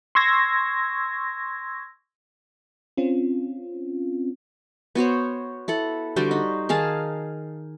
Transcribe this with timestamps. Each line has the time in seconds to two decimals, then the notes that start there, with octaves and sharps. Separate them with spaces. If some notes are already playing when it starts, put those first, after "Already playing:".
0.15 C6 C#6 E6 G#6 A#6
2.97 C4 C#4 F4
4.95 B3 F#4 C5 C#5
5.68 E4 A4 F#5
6.16 D3 G3 F#4 C5
6.31 D#4
6.69 D#3 G#4 F5 A5